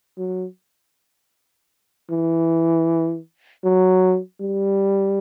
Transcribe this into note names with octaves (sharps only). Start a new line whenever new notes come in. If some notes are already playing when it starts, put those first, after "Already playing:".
F#3
E3
F#3
G3